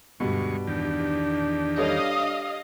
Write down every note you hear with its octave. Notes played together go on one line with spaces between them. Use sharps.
D2 G2 B2 G3 G#3 C#6
E2 D#3 D4 G4
G3 A4 C#5 D#5 F5 D#6